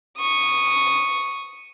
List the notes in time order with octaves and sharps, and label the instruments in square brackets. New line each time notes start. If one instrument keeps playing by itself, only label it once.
[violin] C#6 D#6